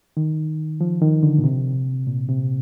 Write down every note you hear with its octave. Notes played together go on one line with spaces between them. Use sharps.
D#3
F3
D#3
D3
A#2
C3
A#2
C3